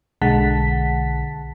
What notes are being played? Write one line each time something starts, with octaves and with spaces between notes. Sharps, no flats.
B1 D3 G#3 F#5 A5 B6